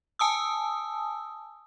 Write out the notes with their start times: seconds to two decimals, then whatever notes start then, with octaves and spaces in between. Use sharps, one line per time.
0.19 G#5 A5 D#6 E6